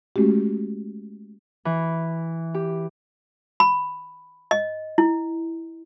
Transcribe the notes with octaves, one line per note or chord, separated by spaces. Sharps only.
G#3 A3 C#4 F#4 G4
E3
G4
B5
D#5
E4